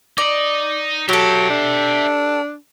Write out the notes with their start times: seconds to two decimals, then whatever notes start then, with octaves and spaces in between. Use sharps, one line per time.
0.18 D#4 D5 D#5
1.09 F#3 G4 A4 E5 G5
1.50 D4